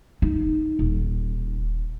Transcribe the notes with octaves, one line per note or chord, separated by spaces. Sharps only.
D#4
D#1